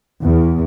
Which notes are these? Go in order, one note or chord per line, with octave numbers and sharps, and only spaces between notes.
E2